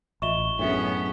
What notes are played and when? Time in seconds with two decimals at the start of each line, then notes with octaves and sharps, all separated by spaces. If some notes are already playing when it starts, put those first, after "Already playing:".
0.22 A1 F4 D#5 E5 C#6 E7 G7
0.59 F#2 A2 B3 C#4 D4 F#4 G#4 E5